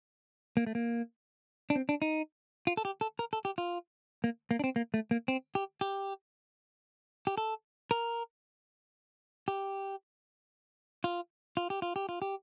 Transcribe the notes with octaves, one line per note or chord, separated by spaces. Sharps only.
A#3
A3
A#3
D4
C4
D4
D#4
F4
A4
G4
A4
A#4
A4
G4
F4
A#3
A#3
D4
C4
A#3
A3
A#3
C4
G4
G4
G4
A4
A#4
G4
F4
F4
G4
F4
G4
F4
G4